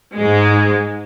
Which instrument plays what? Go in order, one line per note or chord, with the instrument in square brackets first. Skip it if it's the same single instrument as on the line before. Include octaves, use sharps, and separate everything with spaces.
[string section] G#2 G#3